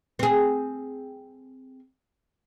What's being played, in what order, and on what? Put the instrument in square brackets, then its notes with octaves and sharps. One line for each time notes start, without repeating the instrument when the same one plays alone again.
[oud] C4 G#4